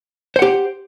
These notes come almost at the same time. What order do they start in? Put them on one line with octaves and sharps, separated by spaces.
C5 F#5 G4